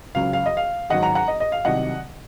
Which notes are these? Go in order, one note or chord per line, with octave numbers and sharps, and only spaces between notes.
C#2 C#3 F#3 F5
F5
D#5
F5
G#1 G#2 F#3 D#5 F#5
F#5 A#5
F#5 A#5
D#5
D#5
F5
C2 C3 D#3 F#3 D#5 F#5